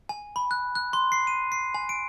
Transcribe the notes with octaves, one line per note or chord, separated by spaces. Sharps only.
G#5
B5
F#6
F#6
C6
C7
D#7
C7
G#5
D7